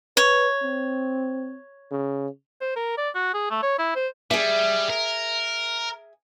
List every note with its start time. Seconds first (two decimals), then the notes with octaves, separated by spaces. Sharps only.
0.17 B4 C#5
0.62 C4
1.91 C#3
2.61 C5
2.76 A#4
2.97 D5
3.15 F#4
3.34 G#4
3.51 A3
3.63 C#5
3.79 E4
3.96 C5
4.31 G3 G#4 E5
4.90 A#4